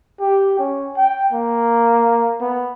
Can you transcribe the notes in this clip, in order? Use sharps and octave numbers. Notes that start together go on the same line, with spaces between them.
G4
C#4
G5
A#3
B3